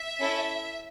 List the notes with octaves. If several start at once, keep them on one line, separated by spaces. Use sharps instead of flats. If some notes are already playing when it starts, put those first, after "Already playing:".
Already playing: E5
C#4 E4 A4